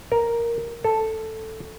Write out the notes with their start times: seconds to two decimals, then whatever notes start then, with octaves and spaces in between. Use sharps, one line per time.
0.12 A#4
0.84 A4